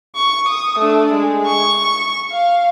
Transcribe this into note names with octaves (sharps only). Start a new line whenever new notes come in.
C#6
D#6
A3 D4
G#3
C#6
F5